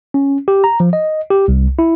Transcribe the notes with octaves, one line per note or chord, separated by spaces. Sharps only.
C#4
G4
A#5
F3
D#5
G4
C2
E4